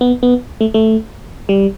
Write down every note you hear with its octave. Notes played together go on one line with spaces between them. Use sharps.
B3
B3
A3
A3
G3